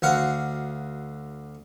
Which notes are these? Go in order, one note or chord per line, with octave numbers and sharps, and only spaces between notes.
D2 F#4 F5